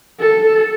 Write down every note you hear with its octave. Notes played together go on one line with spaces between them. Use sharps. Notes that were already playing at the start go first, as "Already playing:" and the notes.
A4